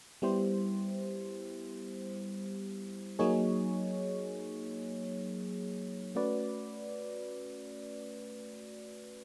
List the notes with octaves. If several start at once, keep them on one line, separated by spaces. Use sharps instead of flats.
G3 B3 E4 G4 C5
F#3 A#3 D#4 G#4 C#5
A3 C#4 F#4 B4 D5